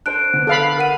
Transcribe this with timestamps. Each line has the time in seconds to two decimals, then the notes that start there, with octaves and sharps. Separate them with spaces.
0.06 D4 A4 C5 F#6 D7
0.34 D3 B3
0.47 A4 F5 B5
0.78 A#4 F#5 D#7